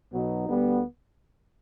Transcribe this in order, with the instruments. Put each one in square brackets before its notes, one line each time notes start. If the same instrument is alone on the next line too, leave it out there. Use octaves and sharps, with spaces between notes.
[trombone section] B1 B2 F#3 B3 D#4
D2 D3 G3 B3